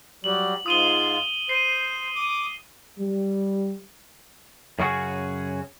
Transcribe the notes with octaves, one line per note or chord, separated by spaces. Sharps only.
F#3 G3 F#7
G#2 F4 D#6 D#7 G7
C5 C7 D#7
D6 D#6
G3
F#2 C#3 C#4 F#4 G#4